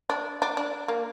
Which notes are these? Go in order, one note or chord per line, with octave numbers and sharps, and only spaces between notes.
D4
D4
D4
A#3